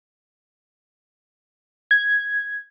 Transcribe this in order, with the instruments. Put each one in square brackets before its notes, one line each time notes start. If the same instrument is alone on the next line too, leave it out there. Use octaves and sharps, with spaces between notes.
[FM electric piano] G#6